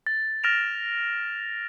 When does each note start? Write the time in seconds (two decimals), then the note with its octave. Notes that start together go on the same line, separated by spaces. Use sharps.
0.07 A6
0.44 F6 A6 A#6 D7 E7 F7